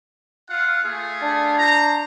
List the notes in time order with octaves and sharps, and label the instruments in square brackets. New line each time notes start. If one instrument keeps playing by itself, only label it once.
[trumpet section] F4 F5 F#5
A3 F4 G#4
[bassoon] D4
[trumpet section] C5 A#5